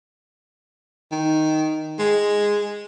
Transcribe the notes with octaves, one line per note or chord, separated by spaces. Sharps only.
D#3
G#3